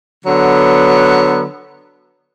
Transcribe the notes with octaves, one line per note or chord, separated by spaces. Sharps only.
D3 F#3 B3